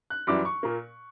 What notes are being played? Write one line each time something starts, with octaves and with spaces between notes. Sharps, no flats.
F#6
F#2 E3 G3 D6
C#6
A#2 A#3